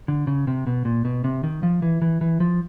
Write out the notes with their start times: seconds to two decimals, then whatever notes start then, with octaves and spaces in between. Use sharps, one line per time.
0.08 D3
0.27 C#3
0.47 C3
0.67 B2
0.85 A#2
1.05 B2
1.24 C3
1.44 D#3
1.63 F3
1.82 E3
2.02 E3
2.21 E3
2.40 F3